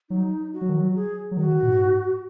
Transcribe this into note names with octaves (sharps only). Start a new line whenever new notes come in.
F#3 D#4
F#4
F#3
D#3
F#3
G#4
F#3
D#3 F#4
D#3
A#2
G#2